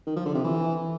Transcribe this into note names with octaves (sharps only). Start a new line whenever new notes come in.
D#3
F3
D3
C3
E3